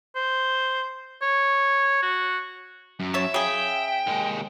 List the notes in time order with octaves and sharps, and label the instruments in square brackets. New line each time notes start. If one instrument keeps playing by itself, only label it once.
[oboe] C5
C#5
F#4
[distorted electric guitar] F#2
[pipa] C#5 A5 [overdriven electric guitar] E5
[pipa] C#3 G#4 [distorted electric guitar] G5
[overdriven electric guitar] D#2 G#3